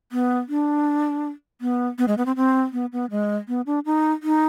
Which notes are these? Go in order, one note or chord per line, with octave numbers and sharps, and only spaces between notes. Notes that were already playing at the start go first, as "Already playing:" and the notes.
B3
D4
B3
B3
G#3
B3
C4
C4
B3
B3
G#3
B3
D4
D#4
D#4